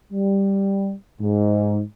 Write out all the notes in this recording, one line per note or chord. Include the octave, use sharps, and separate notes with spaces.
G3
G#2